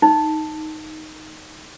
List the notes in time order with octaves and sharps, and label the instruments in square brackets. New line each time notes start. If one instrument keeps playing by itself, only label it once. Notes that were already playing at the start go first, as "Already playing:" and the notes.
[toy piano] D#4